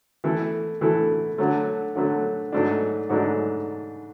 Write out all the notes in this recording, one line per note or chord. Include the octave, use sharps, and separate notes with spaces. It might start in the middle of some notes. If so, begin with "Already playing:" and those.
E3 A3 E4 A4
E3 A3 E4 A4
D3 F#3 A3
D3 F#3 A3
G#2 F#3 A3 D4
G#2 F#3 A3 D4